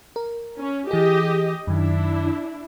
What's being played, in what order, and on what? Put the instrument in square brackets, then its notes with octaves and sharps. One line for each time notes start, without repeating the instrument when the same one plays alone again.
[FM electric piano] A#4
[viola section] C#4
[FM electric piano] E3 G#4 [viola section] G4 D#5
[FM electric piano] F#2 D#3 [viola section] D4 E4